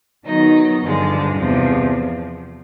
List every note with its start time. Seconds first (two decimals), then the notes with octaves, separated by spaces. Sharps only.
0.26 D#3 F#3 B3 D#4
0.82 G2 D3 F3 G#3
1.37 E2 C3 F3